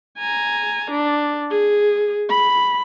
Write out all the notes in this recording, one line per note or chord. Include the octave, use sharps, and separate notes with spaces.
G#5 A#5
D4
G#4
B5